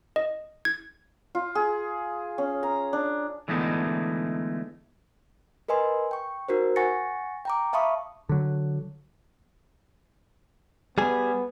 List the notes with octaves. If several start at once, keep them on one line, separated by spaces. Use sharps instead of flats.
D#5
G#6
F4
G#4
C#4
A#5
D4
D3 E3 G#3 A3 B3 D#4
A#4 B4 D#5 G#5 C6
G5 C#6
D#4 F#4 A#4 C5
F#5 G#5 C#6 A6 A#6 C#7
G5 A#5 D6
E5 F5 A5 B5 C#6 D#6
D3 F#3
G3 B3 G#4